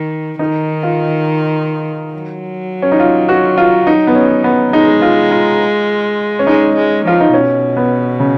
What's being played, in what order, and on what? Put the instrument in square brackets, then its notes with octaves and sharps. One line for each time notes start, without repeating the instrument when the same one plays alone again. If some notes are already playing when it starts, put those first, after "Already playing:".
Already playing: [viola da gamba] D#3
[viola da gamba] D#3 [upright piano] D#4
[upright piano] F4
[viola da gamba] F#3
[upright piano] C#4
D#4
F4
F#4
F4
D#4
B3
C#4
B3
[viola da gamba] G#3 [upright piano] D#4
[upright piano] F4
F4
C#4
[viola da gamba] G#3 [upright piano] D#4
[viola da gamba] G#3
[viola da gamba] F3 [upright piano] F4
[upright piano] D#4
[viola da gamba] B2 [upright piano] C#4
[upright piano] B3
C#3